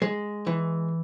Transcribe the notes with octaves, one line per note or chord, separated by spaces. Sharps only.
G#3
E3